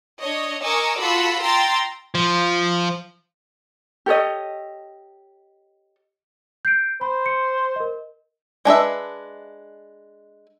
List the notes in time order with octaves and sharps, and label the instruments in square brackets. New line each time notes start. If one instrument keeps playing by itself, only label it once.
[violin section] D4 C#5 D#5
A#4 D#5 G#5 C#6 D6 E6
F4 F#4 A4 B5 E6
G5 A#5 C6 E6 A6
[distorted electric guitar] F3
[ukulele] G4 A4 C#5 D#5
[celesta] G6 C7 D7
[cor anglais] C5 [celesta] B5
[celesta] C#7
A#4 D#5
[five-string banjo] G#3 D4 B4 E5